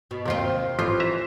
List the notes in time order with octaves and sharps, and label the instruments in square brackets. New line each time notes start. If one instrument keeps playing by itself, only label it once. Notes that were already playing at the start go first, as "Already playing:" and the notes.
[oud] B2
[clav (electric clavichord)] D#2 C3 [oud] D#3 C4 F4
[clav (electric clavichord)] A1 E3 F3 [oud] F4
[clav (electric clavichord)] E3 E5 A#5